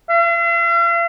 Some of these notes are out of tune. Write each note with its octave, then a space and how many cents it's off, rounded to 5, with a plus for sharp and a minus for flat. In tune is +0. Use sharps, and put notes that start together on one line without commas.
F5 -45